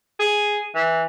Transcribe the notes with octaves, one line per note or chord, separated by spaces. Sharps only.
G#4
E3